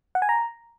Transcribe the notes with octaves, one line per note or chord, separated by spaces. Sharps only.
F#5
G#5
A#5